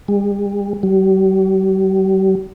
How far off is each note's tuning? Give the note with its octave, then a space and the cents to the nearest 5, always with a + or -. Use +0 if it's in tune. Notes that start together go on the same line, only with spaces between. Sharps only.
G3 +45
G3 -45